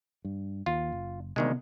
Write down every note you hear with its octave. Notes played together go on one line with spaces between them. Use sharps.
G2
D#2 F4
F#1
D2 C3 D#3 G#3 B3